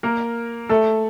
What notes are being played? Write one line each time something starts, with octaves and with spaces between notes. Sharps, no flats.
A#3 A#4
A3 A4